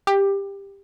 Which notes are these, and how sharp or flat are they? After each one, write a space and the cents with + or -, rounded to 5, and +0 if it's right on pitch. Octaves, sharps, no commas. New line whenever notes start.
G4 +15